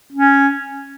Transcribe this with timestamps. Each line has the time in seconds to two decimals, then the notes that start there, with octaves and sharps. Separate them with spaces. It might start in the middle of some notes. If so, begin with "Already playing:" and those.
0.12 C#4